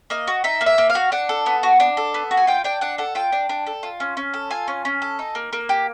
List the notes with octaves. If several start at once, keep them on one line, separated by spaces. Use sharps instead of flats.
A#3 D#5
F#4
D#4 E5
A#3
E5
A#3
F5
F#4
D4 F#5
A4
B3
F#4
D4
A4
B3
F#4
G#5
F4 G5
D4 G5
D4 F#5
A4 F#5
F4 G5
D4
D4
A4
F4
C#4
C#4
A4
F4 G#5
C#4
C#4
A4
D#4
A#3
A#3
G4